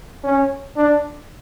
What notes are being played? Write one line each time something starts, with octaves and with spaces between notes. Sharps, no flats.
C#4
D4